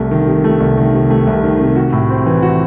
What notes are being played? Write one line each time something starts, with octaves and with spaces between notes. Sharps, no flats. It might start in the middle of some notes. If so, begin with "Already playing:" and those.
Already playing: C2 A3
D#3
C3
A3
C2
D#3
C3
A3
C2
D#3
C3
F#4
A2
C4
E3
F#4